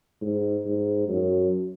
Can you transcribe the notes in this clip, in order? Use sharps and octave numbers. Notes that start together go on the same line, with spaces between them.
G#2
G#2
F#2